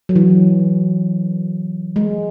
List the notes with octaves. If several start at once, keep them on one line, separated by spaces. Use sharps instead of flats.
F#3
E3
G#3